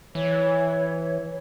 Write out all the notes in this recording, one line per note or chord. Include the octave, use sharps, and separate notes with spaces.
E3 C#5